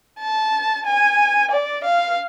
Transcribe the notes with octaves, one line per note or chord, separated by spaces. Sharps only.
A5
G#5
D5
F5